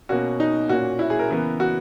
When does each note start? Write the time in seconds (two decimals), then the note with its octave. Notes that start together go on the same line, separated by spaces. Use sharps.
0.09 B2 A#3 C#4 F#4
0.40 D#4
0.69 A#2 A#3 C#4 F#4
0.99 E4
1.10 G#4
1.19 A#4
1.30 C#3 E3 B3
1.60 F#4